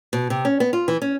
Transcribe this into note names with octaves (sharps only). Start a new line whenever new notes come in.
B2
C3
C#4
B3
F4
E3
C#4